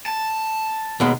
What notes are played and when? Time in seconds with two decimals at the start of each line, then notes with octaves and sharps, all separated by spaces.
0.06 A5
1.00 D#2 B2 G#3